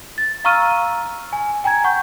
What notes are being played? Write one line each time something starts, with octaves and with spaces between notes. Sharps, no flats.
A6
F5 A#5 C#6 E6 F6 D#7
G#5
G5 G#5 A#5 G#6
F#5 C#6 G6